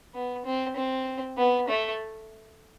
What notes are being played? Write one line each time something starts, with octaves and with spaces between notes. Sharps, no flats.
B3
C4
C4
B3
A3